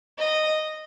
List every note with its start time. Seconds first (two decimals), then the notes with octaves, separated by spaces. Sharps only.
0.18 D#5